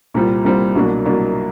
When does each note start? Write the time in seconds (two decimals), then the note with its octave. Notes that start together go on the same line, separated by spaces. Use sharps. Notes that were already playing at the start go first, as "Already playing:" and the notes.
0.14 C2 A#2 G3 C4 F4
0.44 C2 A#2 G3 C4 F4
0.75 C2 B2 F#3 A#3 D4
1.06 C2 B2 F#3 A#3 D4